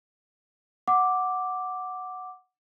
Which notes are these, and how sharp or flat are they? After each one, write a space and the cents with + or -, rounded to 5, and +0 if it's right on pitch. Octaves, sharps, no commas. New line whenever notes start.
F#5 -5 D6 +0